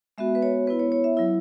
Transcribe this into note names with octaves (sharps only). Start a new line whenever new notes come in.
G#3 B3 F#4 E5
B4
C#5
B3 E4 B4
C#5
C#5
E5
F#3 E4